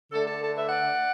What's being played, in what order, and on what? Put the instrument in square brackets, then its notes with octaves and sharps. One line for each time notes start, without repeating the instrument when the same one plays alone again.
[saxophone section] D3 A3 D4 A4
A4
A4
B4 E5
D5 F#5